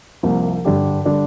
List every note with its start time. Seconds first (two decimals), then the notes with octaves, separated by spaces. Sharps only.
0.23 C2 C3 F3 A#3
0.65 G2 D3 G3 D4 G4
1.05 D3 G3 D4 G4